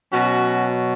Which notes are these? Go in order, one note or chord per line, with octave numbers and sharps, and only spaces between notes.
B2 F#3 C#4 F#4